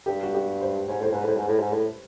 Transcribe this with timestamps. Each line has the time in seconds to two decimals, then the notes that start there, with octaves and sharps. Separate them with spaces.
0.06 G2 G4
0.23 F#4
0.34 G4
0.61 C5
0.88 G#2 C#5
1.01 A2 C5
1.12 G#2 B4
1.24 A2 C5
1.37 G#2
1.48 A2
1.60 G#2
1.73 A2